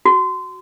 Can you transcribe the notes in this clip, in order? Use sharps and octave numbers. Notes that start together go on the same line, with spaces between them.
F#4